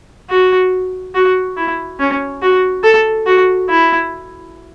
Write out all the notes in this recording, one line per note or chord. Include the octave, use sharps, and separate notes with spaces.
F#4
F#4
E4
C#4
F#4
A4
F#4
E4